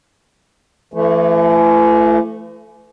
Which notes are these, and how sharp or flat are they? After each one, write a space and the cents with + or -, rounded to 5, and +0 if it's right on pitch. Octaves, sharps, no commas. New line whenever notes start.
E3 +40 A3 +0